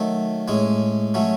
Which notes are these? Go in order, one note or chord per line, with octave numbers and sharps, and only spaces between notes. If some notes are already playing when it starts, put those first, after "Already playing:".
Already playing: D#3 F#3 A3
A2 G#3 C#4
F#3 A3 C#4